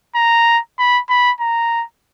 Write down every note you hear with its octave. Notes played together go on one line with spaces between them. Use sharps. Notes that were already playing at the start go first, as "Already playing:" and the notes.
A#5
B5
B5
A#5